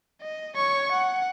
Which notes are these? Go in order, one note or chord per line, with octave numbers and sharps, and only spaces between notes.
D#5
C#5 C#6
F#5